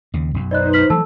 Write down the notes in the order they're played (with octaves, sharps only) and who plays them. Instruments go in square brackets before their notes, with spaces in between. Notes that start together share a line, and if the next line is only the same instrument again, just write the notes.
[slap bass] D#2 C#3
B1 F#2
[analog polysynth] D#4 B4 C5 [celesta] D5 D#5 F#6
[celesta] F6 B6 F#7
[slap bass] E3 F#3 A3 [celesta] A4 A5 E6